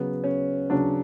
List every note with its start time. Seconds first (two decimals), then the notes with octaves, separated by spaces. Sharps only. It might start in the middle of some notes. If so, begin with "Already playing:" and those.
Already playing: C#3 F#3 B3
0.24 C#4
0.70 C#3 F#3 D4